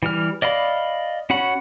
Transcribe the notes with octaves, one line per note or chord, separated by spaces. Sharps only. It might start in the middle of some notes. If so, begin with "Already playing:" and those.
E3 G3 F6
D5 D#5 F5 B5
C#4 F#4 F#5 B5